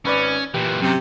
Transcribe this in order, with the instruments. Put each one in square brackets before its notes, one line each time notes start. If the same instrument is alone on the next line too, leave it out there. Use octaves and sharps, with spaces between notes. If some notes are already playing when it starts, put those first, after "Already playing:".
[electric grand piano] G#1 B4 D5 [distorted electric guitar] C#4
[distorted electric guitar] A#2 E3 [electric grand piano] G4
[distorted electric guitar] F#2 [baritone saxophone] C3